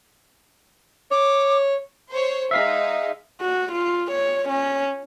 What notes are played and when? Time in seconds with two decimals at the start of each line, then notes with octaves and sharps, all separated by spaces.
1.11 C#5 D6
2.10 C5 C#5
2.51 G#3 D#4 E5 F5 B6
3.41 F#4
3.72 F4
4.11 C#5
4.49 C#4